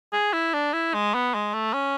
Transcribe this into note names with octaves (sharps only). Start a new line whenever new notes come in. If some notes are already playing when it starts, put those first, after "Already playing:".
G#4
E4
D4
E4
G#3
B3
G#3
A3
C#4